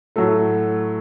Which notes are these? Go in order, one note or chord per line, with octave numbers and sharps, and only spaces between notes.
A2 F#3 A3 A4